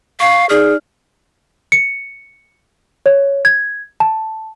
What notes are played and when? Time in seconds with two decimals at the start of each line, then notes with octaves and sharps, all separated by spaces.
0.20 F5 C#6
0.49 D#4 G#4 D5 F6
1.72 C#7
3.06 C#5
3.45 G#6
4.00 A5